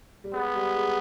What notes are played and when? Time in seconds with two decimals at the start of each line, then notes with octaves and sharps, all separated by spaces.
0.24 G3
0.33 G#3 B3
0.55 G3
0.76 G#3